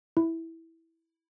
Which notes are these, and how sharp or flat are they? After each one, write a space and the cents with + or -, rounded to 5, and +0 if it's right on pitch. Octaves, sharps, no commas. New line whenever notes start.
E4 -5